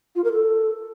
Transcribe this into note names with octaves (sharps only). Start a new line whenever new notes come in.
F4
A#4
A4